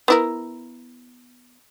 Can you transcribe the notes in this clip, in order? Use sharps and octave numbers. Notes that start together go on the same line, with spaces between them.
B3 E4 A#4